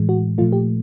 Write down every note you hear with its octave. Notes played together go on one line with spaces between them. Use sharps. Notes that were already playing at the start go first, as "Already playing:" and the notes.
Already playing: A2 E3 G#3
F#4
A#2 F3 A3 F4
G4